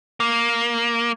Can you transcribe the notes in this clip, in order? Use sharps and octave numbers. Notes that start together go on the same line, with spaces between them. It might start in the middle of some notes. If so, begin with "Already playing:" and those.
A#3